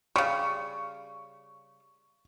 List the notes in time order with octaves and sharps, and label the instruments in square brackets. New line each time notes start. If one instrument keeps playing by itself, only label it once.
[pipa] C#3 G3 [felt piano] C#6